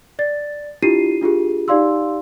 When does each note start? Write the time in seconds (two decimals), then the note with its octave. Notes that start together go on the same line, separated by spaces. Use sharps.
0.19 D5 A6
0.82 D4 E4 F4 G4 C7 D#7
1.21 D4 F4 G4 G#4
1.68 D#4 G4 D5 F5 C6 E6